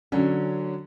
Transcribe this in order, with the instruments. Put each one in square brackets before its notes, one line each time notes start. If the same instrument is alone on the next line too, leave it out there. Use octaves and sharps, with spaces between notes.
[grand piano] D3 F#3 [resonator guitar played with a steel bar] C#4